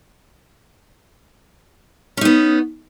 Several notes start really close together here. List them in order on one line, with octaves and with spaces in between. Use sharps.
C#4 D#4 B3